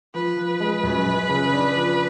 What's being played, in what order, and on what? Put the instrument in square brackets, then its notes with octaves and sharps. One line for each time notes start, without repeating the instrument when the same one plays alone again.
[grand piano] F3 [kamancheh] B4
[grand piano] F3
G#3
F#2
F#2
C#3
D4
F3